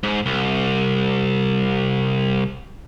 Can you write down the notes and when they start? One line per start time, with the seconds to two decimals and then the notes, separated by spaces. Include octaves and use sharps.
0.03 G#2
0.26 C2